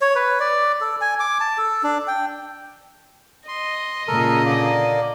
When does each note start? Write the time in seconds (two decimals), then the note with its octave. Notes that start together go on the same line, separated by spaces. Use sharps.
0.01 C#5
0.15 B4
0.40 D5
0.81 A4
1.01 G#5
1.20 D6
1.40 A5
1.58 A4
1.83 D4
2.07 G5
3.48 D#5 C6
4.08 A#2 C#3 A4 A#4
4.46 D3 A#3 D5